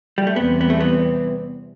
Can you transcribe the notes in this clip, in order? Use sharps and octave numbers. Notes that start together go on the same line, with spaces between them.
G3
A3
E2 C3 E3 G3 B3 C4
B3
A3
B3